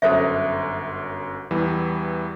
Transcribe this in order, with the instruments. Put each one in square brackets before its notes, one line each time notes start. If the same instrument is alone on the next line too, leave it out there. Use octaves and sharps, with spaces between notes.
[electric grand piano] G1 F#2 [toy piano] A4 C5 E5
[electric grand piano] E2 E3 G3